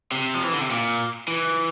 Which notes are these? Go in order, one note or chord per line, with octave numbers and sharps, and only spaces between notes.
C3
F3
E3
D3
C3
A#2
E3